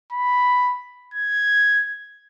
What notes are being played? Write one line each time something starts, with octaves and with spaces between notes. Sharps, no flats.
B5
G#6